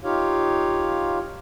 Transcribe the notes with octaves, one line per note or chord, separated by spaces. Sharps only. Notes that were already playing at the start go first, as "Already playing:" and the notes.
D#4 F4 G4 C#5 F5